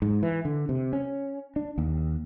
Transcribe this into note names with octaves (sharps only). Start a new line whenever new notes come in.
G#2
E3
D3
C3
C#4
D4
D#2